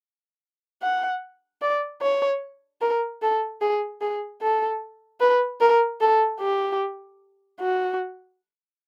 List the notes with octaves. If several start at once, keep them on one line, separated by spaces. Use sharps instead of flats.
F#5
D5
C#5
A#4
A4
G#4
G#4
A4
B4
A#4
A4
G4
F#4